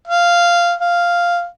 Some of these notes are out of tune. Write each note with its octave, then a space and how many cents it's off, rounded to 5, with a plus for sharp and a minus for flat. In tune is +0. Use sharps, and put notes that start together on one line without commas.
F5 -10
F5 -5